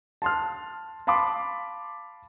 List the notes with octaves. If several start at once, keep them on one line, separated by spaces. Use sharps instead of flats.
A5 C6 F6
F5 A5 B5 C6 D6